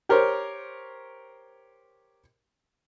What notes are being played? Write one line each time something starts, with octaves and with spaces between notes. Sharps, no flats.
G4 A#4 C5 C#5